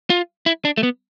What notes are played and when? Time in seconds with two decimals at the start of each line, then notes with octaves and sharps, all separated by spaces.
0.10 F4
0.46 E4
0.65 D4
0.77 A3
0.83 B3